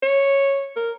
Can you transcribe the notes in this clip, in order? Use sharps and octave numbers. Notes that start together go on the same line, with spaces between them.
C#5
A#4